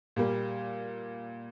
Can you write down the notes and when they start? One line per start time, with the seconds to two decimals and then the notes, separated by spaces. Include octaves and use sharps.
0.16 A#2 G3 A#3